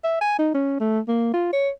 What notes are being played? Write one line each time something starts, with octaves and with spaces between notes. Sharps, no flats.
E5
G#5
D#4
C#4
A3
A#3
F4
C#5